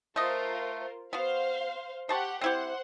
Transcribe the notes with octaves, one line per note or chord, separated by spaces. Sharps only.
A3 F4 A#4 C5 D#5
B3 F#4 C5 F5
G4 C5 F#5 A5 C#6
C4 E4 G4 C5 F#5